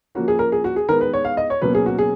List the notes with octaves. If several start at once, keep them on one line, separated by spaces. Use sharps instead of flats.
F3 A#3 C#4 F#4
G#4
A#4
G#4
F#4
G#4
D#3 G#3 B3 A#4
B4
C#5
F5
D#5
C#5
B2 F#3 A#3 C#4 B4
G#4
F#4
G#4